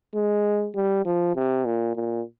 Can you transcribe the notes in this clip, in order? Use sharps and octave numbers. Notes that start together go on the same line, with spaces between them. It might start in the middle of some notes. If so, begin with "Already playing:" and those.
G#3
G3
F3
C3
A#2
A#2